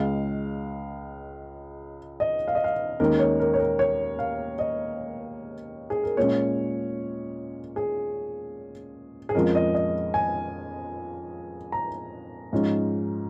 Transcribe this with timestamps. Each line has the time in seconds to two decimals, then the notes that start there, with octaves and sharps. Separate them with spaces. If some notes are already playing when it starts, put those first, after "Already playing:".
Already playing: C#2 C#3 G#3 F5
2.20 D#5
2.48 F5
2.55 D#5
2.64 F5
3.00 D#2 D#3 G#3 C#4 A#4
3.19 C#5
3.40 A#4
3.54 C#5
3.60 A#4
3.79 C#5
4.19 F5
4.59 D#5
5.90 G#4
6.03 A#4
6.17 A#2 G#3 C#4 C#5
7.76 G#4
9.29 G#4
9.35 F2 F3 G#3 C#4 A#4
9.55 D#5
9.75 D#5
10.14 G#5
11.72 A#5
12.53 G#2 F3 G#3 C#4